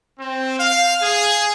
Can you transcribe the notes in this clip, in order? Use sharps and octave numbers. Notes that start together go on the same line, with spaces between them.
C4
F5
G#4